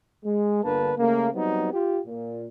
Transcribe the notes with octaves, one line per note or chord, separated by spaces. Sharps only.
G#3
G1 D3 A#3 B4 A5
C#3 A3 A#3
F#3 G3 B3 C4 D#4
F4 G4
A#2